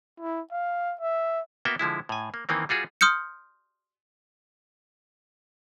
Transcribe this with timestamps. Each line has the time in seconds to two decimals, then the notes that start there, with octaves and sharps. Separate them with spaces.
0.20 E4
0.52 F5
1.00 E5
1.65 A#3 B3 F#4 E5 G5
1.79 D3 F3 G#3 E4
2.09 A2 G#5
2.34 A#3
2.49 D#3 E3 A#3 C4
2.69 G3 F4 F#4 G#4
3.01 C6 D#6 F6 G6 C#7